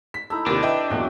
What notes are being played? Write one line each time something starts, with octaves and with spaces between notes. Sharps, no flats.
B6
A3 D#4 E4 A#5 E6
D#2 C3 D4 G4 A#4
B4 D#5 E5 G5
E2 A#2 F#3 G#3 C#4 F#4